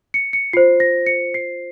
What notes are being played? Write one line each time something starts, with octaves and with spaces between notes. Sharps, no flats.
C#7
C#7
F4 C5 C7
A#6
C#7
C7